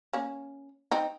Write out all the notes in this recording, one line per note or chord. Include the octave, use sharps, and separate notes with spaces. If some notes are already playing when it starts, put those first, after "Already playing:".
A#3 C#4
C4 D#4